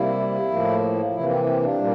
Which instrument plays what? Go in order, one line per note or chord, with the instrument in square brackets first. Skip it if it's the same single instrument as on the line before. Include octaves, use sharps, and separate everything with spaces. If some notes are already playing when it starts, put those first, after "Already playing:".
Already playing: [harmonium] C3 G3 A#3 E4
A2 F3 A#3
C3 E3 A#3 E4
C4
C4
D4
A#2 G3 A#3